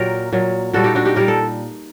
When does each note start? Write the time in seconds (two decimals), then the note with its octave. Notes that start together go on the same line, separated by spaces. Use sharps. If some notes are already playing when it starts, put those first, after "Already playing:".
Already playing: A#2 F#3 G4 A#4
0.33 A#2 F#3
0.73 A#2 G3 F#4 A4
0.84 D#4 G4
0.95 D4 F#4
1.05 D#4 G4
1.16 A#2 G3 G4 A#4
1.28 A4